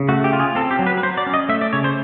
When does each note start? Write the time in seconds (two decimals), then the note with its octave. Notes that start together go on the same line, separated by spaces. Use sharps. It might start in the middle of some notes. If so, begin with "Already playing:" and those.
Already playing: C#3
0.08 A3 F#4
0.24 G4
0.33 F4
0.40 G#4
0.55 C4 A4
0.71 G4
0.79 F#3
0.87 B4
0.97 B4
1.03 F#3 C5
1.17 D5
1.26 C#4
1.34 D#5
1.49 A3 E5
1.61 D5
1.73 C#3 C#5
1.84 C5